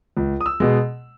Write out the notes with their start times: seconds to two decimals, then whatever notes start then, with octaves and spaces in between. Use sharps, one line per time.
0.17 C#2
0.41 D#6
0.46 E6
0.60 B2 G#3